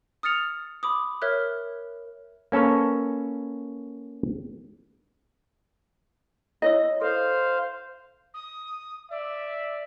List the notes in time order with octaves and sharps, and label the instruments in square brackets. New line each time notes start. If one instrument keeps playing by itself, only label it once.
[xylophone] D#6 F6 A6 C#7 F7
B5 D6 D#6
A#4 C#5 E5 F6 F#6
[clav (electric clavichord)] A#3 C#4 A4 B4 C#5
[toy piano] E4 C#5 E6 [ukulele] D#5
[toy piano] A4 [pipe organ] C5 F5
[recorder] D#6
[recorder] D5 [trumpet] E5